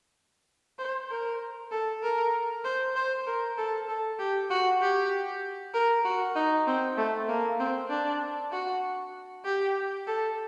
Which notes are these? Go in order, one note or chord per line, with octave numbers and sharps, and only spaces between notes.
C5
A#4
A4
A#4
C5
C5
A#4
A4
A4
G4
F#4
G4
A#4
F#4
D#4
C4
A3
A#3
C4
D4
F#4
G4
A4